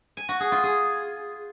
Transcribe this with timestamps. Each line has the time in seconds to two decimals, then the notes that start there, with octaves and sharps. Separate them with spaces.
0.17 G#5
0.29 F#4
0.40 G#4
0.52 F4
0.63 G#4